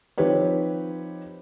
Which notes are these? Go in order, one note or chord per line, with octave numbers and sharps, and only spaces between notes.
F3 C4 D#4 G4 B4 C#5